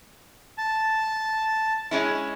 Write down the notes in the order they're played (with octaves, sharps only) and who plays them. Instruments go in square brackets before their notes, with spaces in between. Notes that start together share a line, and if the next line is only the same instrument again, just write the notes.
[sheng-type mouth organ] A5
[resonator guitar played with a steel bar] G#3 C#4 E4